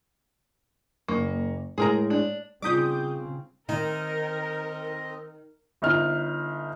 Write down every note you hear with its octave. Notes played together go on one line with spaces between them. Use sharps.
F#1 A#3 C#6
A2 G#3 G#4 A#4 A#5
D4
C#3 G3 C4 D#4 F4 D6 D#6 G6
D#3 C4 D#4 A#4 D#5
G1 D#4 F6